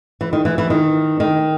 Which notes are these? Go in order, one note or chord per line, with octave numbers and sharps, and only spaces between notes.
E3
D#3
E3
E3
D#3
D#3